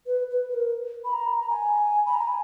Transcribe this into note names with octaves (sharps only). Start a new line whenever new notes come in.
B4
B4
B4
A#4
B5
A#5
A#5
G#5
B5
A#5
G#5